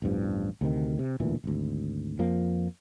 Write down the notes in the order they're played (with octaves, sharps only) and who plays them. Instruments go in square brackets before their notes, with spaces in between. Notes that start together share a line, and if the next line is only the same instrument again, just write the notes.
[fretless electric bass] A1 E2 G2 F3
D2 C3 D#3
C3
E1 D2 A#2 E3
G#1 D2
F2 F3 A#3